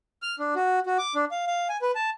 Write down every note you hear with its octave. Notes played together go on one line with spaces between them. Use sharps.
F6
D4
F#4
F#4
D6
D4
F5
F5
G#5
B4
A5